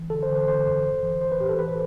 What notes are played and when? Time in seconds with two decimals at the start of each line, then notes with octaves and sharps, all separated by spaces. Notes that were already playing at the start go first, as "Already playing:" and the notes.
Already playing: E3
0.10 D3 A4
0.23 C5
0.29 D3
0.35 C5
0.48 D3 C5
0.67 F#2
0.84 A2
1.03 E3
1.21 E3 C5
1.32 B4
1.40 A2 G4
1.49 A4
1.59 E3 B4
1.68 C5